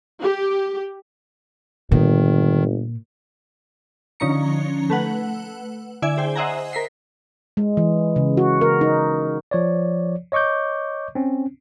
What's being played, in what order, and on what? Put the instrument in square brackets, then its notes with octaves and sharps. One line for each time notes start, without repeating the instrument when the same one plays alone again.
[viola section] G4
[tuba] G1 [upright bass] A#2 [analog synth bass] D#3
[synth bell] D3 F3 C#4 D#4 A#5 C#7
A3 B4 F#5
D3 E4 D5 E5 G#5 G#6
G#4 C5 G5 G#5
C5 D#5 E5 F#5 G#5 A#5
A#4 B6 C7
[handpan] G#3
E3
C#3
F#4
A#4
D#4
[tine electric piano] F3 C#5 D5
C#5 D#5 C#6 D6 G6
C4 C#4